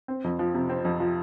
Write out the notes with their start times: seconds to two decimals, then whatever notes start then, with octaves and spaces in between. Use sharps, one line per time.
0.08 C4
0.24 F2
0.39 F3
0.55 C3
0.69 C4
0.85 F2
1.00 F3